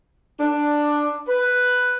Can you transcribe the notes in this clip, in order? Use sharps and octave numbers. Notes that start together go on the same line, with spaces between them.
D4
B4